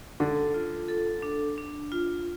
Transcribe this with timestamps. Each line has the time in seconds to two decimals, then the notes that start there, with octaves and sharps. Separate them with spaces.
0.20 D3 A4
0.54 F4
0.88 A4
1.22 D4
1.58 D4
1.92 F4